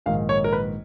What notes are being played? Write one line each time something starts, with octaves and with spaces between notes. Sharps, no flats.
A#1 G#2 D#3 F5
C#5
A#4
B4